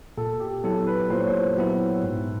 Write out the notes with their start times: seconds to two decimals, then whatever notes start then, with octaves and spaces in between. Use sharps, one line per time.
0.17 A#2 A4
0.40 G4
0.64 F#3 B3 E4 A4
0.87 B4
1.10 A#2 C5
1.19 C#5
1.28 C5
1.57 F#3 B3 E4
2.04 G#2